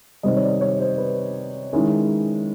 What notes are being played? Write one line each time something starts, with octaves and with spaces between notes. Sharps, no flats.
C3 D#3 G3 C4 D#5
C#5
D5
C#5
C5
B4
D#3 G#3 C#4 E4